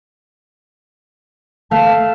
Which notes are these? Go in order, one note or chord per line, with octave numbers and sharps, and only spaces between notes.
A3 F5 A5 C7